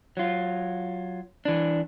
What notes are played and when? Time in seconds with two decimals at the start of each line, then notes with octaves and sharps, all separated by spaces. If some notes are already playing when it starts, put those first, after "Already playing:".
0.17 F#3 F4
1.45 E3 D4